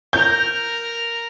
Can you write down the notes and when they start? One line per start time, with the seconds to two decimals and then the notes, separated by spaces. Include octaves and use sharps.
0.13 A#4 A#5 G6